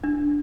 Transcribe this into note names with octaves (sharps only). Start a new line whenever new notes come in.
D4